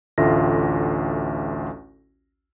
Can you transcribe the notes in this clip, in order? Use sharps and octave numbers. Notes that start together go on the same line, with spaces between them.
A1 D2 F4 A4 E5 A#6